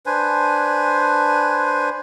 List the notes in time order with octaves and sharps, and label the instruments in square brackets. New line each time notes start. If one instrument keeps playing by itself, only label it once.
[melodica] D4 B4 C5 G#5